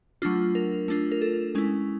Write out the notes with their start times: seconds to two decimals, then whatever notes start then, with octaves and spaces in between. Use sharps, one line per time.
0.22 F#3 A3 D4 F4
0.55 A#4
0.88 A3 D4 F4
1.12 A#4
1.22 A4
1.55 G#3 C#4 E4